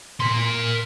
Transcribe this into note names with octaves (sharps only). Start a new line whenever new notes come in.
A#4 C6